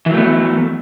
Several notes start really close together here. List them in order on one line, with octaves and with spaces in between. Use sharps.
E3 F#3 A3 B3